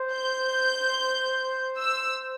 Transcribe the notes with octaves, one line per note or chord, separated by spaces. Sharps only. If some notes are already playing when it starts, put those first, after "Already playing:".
Already playing: C5
G6
E6